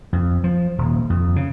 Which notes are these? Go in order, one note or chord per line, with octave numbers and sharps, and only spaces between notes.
F2
F3
D#1
F2
C#3